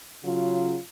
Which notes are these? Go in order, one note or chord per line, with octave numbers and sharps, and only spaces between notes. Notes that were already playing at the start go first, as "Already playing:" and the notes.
C#3 F#3 F4